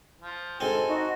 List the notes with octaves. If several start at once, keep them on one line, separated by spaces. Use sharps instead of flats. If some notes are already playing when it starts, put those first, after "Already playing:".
F3
D2 G#2 C4 A4 G#5
D#4 F#4